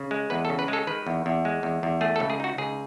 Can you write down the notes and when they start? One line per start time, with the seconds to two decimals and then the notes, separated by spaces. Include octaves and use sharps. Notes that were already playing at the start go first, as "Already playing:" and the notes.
Already playing: C#3
0.11 G#3
0.30 E2 B4
0.45 A4
0.49 C#3
0.59 B4
0.68 G#3 A4
0.87 D#3 B4
1.07 E2
1.26 E2
1.45 G#3
1.63 E2
1.83 E2
2.01 A3 G#4
2.16 A4
2.20 C#2
2.30 G#4
2.40 D#4 F#4
2.58 C#2 G#4